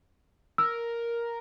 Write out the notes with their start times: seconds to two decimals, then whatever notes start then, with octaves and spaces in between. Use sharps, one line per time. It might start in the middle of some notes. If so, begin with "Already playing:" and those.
0.58 A#4 E6